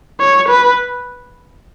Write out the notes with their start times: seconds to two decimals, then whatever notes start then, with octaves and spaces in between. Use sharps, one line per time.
0.20 C#5
0.49 B4